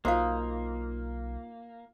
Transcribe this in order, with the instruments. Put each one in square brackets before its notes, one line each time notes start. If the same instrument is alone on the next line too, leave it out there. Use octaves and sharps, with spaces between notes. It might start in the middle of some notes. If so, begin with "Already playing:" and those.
[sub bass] B1 [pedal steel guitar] A#3 [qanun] D#4 F4 [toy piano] F#4 C5 F5